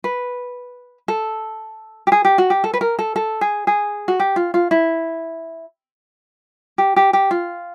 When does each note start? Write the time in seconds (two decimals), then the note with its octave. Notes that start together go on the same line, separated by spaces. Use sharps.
0.04 B4
1.08 A4
2.07 G4
2.12 G#4
2.25 G4
2.38 F#4
2.50 G4
2.64 A4
2.74 B4
2.81 A#4
2.99 A4
3.16 A4
3.41 G#4
3.67 G#4
4.08 F#4
4.20 G4
4.36 F4
4.54 F4
4.71 E4
6.78 G4
6.96 G4
7.13 G4
7.31 F4